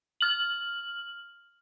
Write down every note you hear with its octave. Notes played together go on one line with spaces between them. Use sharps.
F6 F#7